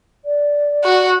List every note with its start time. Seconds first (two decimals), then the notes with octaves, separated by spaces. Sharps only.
0.25 D5
0.84 F#4